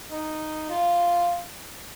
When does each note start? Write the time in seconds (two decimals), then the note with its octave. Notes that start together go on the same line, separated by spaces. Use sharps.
0.10 D#4
0.70 F4